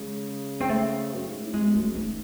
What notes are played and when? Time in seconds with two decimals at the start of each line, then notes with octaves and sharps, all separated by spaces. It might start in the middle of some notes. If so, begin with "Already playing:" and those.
Already playing: C#3 G#3
0.60 C4
0.69 A3
1.14 F#2
1.27 G#2
1.41 A2
1.53 C3 G#3
1.65 E2
1.75 F#2 A3
1.96 G#2 A3